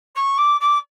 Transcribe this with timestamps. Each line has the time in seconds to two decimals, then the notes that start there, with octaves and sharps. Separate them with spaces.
0.15 C#6
0.37 D6
0.60 D6